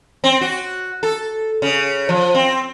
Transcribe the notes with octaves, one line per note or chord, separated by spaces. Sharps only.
C4
F#4
A4
C#3
F3
C4